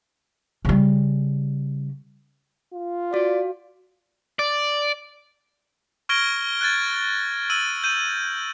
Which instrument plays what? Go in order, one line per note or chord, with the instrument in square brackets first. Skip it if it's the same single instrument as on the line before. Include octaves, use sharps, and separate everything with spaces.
[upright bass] C#3 G3
[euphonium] F4
[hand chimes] F#4 F5 [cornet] D5
[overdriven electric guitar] D5
[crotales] C#6 F6 G#6 A#6 D7 G7
F#6 G#6 A6
E6 D#7 F#7
G6 D#7